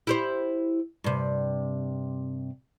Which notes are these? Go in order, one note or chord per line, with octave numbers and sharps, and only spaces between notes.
E4 G4 C5
G2 C3